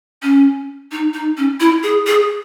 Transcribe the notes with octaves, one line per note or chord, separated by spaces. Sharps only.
C#4
D#4
D#4
C#4
E4
G#4
G#4